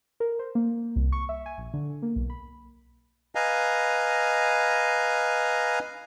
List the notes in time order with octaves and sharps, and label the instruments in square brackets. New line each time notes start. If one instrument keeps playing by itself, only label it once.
[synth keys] A#4
C5
A#3
C2
C#6
E5
G#5
A#1
D3
A#3
B1
B5
[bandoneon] B4 D#5 F5 G#5 A#5